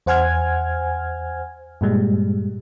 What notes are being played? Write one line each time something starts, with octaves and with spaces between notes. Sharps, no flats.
E2 C5 F#5 G#5 F6 G#6
G2 A#2 G3 G#3